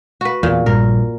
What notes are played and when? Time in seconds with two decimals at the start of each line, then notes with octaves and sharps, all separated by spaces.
0.21 F#4 B4
0.43 E2 A#2
0.66 A#1 G2 A#2 A#4